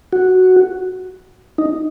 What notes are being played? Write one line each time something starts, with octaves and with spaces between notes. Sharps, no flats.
F#4
D#4